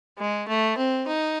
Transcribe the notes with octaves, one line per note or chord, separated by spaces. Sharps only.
G#3
A3
C4
D#4